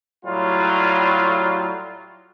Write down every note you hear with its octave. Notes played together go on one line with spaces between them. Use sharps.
A2 F#3 G3 F4